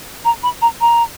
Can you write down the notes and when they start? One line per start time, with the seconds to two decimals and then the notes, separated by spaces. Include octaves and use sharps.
0.25 A#5
0.43 B5
0.62 A#5
0.81 A#5